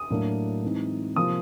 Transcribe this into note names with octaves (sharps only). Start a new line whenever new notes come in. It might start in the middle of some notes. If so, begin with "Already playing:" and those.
Already playing: D#6
A2 F#3 A#3 D4
E3 G#3 C4 D#4
C3 F3 A#3 D#6